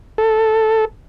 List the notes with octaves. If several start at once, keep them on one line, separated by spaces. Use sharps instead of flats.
A4